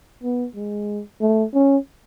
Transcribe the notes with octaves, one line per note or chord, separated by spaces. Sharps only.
B3
G#3
A3
C#4